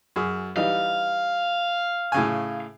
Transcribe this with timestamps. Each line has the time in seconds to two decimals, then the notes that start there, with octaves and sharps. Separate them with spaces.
0.16 F#2 G#4
0.56 E3 G3 D#4 F5
2.12 A2 C#3 G#5